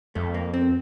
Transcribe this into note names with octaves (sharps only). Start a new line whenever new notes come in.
F2 A3
A#3
C4